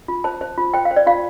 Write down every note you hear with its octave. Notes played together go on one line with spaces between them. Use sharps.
F4
C5 A5
C5
F4
C5 G5
F5
C5
D5
F4 F5